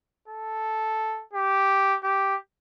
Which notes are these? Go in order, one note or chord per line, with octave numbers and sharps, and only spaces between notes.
A4
G4
G4